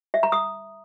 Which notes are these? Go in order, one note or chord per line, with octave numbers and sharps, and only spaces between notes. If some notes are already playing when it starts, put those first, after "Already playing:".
E5
A#5
D#6